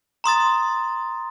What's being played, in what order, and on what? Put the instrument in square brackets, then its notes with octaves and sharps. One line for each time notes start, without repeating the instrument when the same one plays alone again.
[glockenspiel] A#5 C6 D#6 A6